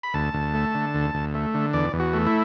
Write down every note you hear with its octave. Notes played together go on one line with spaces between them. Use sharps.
B5
D2 A5
D2
A3
D3
D2
D2
A3
D3
E2 D5
E2
F#4
A3
E4